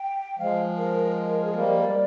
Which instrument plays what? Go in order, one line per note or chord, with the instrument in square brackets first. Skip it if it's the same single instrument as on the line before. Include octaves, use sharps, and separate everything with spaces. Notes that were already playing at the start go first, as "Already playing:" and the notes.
Already playing: [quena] G5
[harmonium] F3 G#3 [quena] F5
[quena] A#4
G#4
[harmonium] G3 A#3 [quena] A#4
[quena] D5